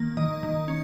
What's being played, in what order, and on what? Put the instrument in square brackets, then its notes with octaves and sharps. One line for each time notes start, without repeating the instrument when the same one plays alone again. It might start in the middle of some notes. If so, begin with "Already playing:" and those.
Already playing: [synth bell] D#3 A#3
D#3 D#5
D#3
C#4